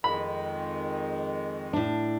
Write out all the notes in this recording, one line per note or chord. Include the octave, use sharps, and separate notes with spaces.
F2 D#3 G#3 B5
A2 D4